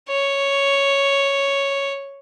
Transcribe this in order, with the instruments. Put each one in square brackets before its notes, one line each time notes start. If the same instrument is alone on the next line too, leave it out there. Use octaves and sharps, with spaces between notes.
[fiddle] C#5